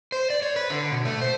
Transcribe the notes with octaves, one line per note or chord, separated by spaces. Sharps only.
C5
D5
C#5
B4
D3
B2
A3
C5